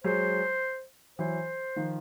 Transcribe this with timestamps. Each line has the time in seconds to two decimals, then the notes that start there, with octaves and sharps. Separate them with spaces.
0.04 F#3 G#3 C5
1.19 E3 F#3 C5
1.76 D#3 F3